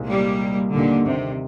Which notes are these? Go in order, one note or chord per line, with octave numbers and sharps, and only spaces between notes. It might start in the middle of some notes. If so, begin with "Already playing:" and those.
Already playing: C2 A#2 G#3 C4 D#4
G3 A#3
D#2 A#2 D3 D#3 G3
C3